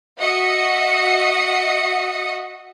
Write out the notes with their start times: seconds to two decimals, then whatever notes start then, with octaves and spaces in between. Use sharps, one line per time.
0.19 F#4 D#5 E5 F#5 D#6 C#7